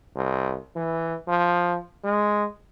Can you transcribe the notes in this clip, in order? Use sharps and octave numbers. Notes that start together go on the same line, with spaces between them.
C2
E3
F3
G#3